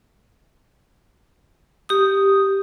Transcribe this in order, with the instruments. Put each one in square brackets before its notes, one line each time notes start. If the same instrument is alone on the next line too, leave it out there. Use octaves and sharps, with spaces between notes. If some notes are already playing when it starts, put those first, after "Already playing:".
[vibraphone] G4 D#6